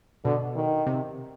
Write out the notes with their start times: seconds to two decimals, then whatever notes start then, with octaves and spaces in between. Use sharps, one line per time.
0.25 B2 D3
0.56 D#3
0.86 C3